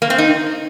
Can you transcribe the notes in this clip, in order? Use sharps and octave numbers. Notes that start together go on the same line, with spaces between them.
A#3
C4
D#4